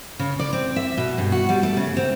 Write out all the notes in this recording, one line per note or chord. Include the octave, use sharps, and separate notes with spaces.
C#3
D5
C4
E5
B2
G2
F#4
G3
A3
C#3
C4